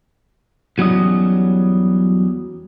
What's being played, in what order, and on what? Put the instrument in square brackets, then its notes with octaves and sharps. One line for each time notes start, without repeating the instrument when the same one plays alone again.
[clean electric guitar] E2 F#3 G3 C#4 D#5